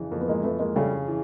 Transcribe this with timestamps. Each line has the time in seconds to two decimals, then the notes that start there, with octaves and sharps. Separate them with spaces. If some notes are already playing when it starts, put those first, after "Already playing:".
Already playing: F2 C#3 E3
0.11 F2 A#3
0.21 B3
0.28 G#3 A#3
0.43 F2 A3 B3
0.59 G#3 A#3
0.76 C#3 G3 A3
1.08 E3